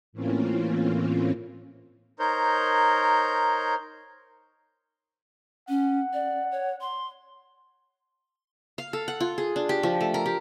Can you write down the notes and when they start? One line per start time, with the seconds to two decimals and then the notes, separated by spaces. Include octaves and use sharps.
0.13 A2 E3 A#3 C4 C#4 F4
2.19 D#4 A#4 C5 C#5 G6
5.69 C#4 F#5
6.13 D5
6.52 C#5
6.81 C6
8.78 F5
8.93 A4
9.08 F#5
9.20 F4
9.38 G#4
9.56 D4
9.69 G4
9.83 F3
10.01 A3
10.14 A#4
10.26 G4